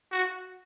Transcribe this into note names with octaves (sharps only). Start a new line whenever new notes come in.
F#4